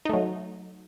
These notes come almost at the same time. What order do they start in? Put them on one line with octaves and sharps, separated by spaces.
D#4 A3 F#3